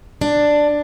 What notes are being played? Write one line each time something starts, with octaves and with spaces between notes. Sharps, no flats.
D4